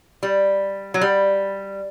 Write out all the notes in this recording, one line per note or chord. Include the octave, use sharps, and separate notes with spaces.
G3
F#3
G3